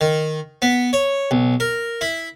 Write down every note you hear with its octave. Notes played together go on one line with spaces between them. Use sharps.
D#3
B3
C#5
B1
A#4
E4